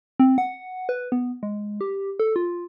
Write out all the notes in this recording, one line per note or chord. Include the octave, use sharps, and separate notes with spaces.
C4
F#5
B4
B3
G#3
G4
A4
F4